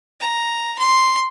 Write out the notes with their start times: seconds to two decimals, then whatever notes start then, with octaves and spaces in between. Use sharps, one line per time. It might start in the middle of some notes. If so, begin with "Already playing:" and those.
0.20 A#5
0.79 C6